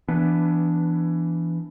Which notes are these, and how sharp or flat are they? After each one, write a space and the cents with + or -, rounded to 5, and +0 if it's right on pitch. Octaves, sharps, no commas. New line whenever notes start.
E3 +20 B3 +5 D4 +0